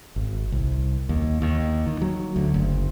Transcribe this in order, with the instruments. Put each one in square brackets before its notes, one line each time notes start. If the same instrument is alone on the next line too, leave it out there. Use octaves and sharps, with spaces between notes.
[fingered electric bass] G#1
C2
D#2
D#2
D#3
F#3
D2
F#1